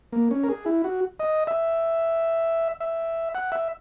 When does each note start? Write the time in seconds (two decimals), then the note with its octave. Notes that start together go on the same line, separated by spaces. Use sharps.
0.13 A#3
0.31 C#4
0.44 A#4
0.49 G#4
0.66 E4
0.84 F#4
1.20 D#5
1.47 E5
2.80 E5
3.35 F#5
3.52 E5